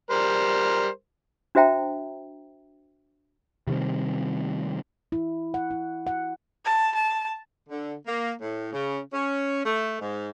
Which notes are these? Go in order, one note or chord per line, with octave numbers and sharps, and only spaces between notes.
G3 A#4 C5
D4 F#4 C5 E5 G5 A#5
C3 D#3 G3 C4
E4
F#5
E4
F#5
A5
A5
D3
A#3
A2
C#3
C#4
A3
G#2